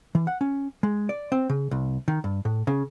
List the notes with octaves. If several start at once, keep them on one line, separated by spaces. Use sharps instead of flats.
E3
F#5
C#4
G#3
D5
C4
C#3
C2
D#3
G2
A2
C#3